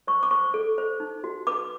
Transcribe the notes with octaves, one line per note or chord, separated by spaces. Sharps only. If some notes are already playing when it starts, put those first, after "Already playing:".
C5 C#6
D6
C5 C#6
A4
C5
D#4
F#4
B4 D6